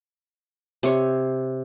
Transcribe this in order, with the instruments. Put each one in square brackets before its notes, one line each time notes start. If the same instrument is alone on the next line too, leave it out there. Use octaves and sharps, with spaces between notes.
[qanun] C3 C#5